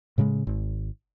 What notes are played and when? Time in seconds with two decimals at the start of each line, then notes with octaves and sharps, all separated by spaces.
0.18 A2 C#3 F3 G#3
0.47 G#1